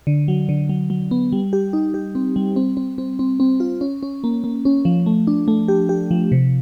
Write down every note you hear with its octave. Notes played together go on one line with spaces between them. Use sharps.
D3
F#3
D3
F#3
F#3
B3
G3
G4
D#4
G4
C4
G3
C4
C4
C4
C4
C4
F4
C#4
C#4
A#3
A#3
C#4
F3
A3
D4
A3
G4
G4
F3
C3